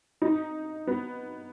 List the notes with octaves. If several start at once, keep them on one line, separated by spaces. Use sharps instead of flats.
D#4
B3